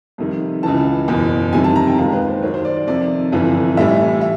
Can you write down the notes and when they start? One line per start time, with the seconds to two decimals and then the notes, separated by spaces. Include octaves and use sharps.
0.18 F2 C3 D#3 G3
0.63 C#2 C#3 E3 A5
1.08 F#1 E2 B2
1.53 F2 C3 D#3 G3 G#5
1.64 A5
1.76 A#5
1.87 G5
1.98 D#2 D#3 G#3 F5
2.13 B4
2.28 C5
2.42 D#2 D#3 F#3 C#5
2.54 C5
2.65 D5
2.77 D5
2.87 F2 C3 D#3 D5
3.32 G1 F2 C3 E3
3.77 A1 A2 E3 G3 E5
4.21 E5